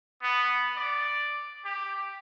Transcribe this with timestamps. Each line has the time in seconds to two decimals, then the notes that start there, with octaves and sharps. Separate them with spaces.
0.22 B3
0.76 D5
1.65 G4